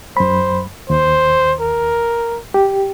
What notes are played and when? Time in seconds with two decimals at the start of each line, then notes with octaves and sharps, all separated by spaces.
0.17 F#2 C5 B5
0.90 D#2 C5
1.61 A#4
2.54 G4